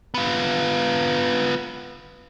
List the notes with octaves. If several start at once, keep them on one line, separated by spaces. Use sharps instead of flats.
B3 F4